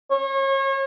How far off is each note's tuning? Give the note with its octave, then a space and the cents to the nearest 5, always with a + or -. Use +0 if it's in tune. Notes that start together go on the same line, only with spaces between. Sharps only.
C#5 -35